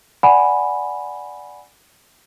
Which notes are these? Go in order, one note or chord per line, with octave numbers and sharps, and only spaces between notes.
D5 F#5 G#5 B5